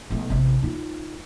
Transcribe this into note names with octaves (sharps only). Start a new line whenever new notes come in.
B1 A3
A1 C3
D#4 F4